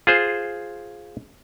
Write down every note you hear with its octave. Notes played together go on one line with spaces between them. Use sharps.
F4 G#4 C5